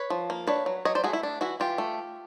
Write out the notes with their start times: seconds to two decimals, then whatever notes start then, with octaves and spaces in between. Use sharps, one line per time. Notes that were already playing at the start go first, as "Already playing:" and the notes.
Already playing: B4 C#5
0.10 F3
0.30 A#3
0.47 D4 B4 C#5
0.66 F#3
0.85 F#3 C#5 D#5
0.95 C5 D5
1.04 A3 F#4 G#4
1.13 E4
1.23 D4
1.41 E3 E4 F#4
1.60 E3 F4 G4
1.78 A3